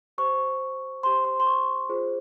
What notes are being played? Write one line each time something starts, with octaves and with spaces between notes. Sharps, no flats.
G4 C5 C#6
G4 C5 C6
C6
C6
C#6
F4 G#4 C5